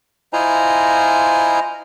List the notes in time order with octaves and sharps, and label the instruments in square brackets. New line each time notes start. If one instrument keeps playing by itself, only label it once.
[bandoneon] E4 F4 C5 D#5 G#5 A#5